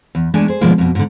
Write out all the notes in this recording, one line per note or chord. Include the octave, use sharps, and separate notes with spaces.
E2
E2 G#3 A3 D4 G#5
G#4 C5
B2 D3 D#3 F3 G#3 A#3
F2 B2
G#2 D3